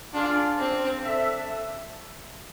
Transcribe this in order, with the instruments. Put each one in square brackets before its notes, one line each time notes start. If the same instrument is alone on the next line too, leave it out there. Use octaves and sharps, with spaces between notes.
[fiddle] D4 [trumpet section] F4 G#4 D5 F5
[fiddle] C4
[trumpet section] D4 A4 E5